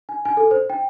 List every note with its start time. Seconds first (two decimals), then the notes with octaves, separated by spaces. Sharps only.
0.09 G#5
0.25 G#5
0.37 A4
0.51 C5
0.70 G5